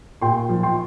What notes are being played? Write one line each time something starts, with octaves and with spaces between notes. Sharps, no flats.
A#2 G5 C6
F3
G5 C6